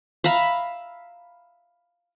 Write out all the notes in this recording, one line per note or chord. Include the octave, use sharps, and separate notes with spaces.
E5 F5 A#5 B5